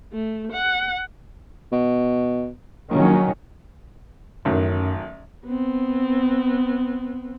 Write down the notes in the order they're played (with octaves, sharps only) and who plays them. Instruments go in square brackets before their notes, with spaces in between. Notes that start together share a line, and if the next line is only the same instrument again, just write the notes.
[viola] A3
F#5
[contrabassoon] B2
[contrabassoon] A#1 [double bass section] D#3 F#3 C#4
[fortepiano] A1 D#3 F#3 [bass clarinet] F#2
[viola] B3 C4